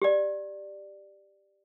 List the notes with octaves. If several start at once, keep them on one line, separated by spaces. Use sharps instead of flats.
G4 D5